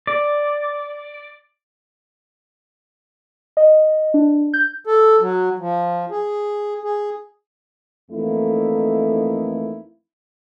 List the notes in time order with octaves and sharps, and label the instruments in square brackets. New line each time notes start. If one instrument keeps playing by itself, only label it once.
[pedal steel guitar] D5
[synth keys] D#5
D4
G6
[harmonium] A4
F#3
F3
G#4
G#4
[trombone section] F2 E3 A3 A#3 D#4 E4